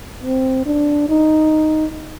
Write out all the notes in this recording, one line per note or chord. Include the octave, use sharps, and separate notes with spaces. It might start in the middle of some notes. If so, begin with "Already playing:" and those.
C4
D4
D#4